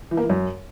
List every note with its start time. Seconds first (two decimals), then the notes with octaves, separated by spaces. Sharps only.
0.11 E3
0.17 A#3
0.23 E3
0.30 F#2